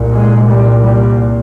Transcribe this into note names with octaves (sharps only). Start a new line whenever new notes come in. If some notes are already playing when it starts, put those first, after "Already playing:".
Already playing: C2 A#2
G#3
G3
G3